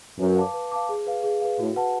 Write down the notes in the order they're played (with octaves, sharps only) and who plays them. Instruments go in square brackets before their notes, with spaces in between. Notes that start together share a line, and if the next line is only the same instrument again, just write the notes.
[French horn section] F#2 [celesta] B4
[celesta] F5 A5 D6
B4
F5 A5 D6
G#4
B4 F5
G#4
B4 F5
[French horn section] A2 [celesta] F#4
[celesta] B4 F#5 A5